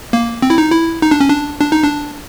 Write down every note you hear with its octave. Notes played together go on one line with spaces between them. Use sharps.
A#3
C4
E4
D#4
E4
D#4
D4
C#4
D4
D4
D#4
D4